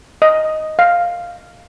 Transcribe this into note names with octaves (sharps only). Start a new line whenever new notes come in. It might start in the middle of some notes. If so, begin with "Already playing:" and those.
D#5
F5